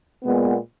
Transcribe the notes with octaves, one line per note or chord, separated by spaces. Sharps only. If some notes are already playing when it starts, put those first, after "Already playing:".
A#2 G#3 B3